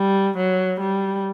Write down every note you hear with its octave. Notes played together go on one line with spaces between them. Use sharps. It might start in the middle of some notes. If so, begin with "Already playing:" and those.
Already playing: G3
F#3
G3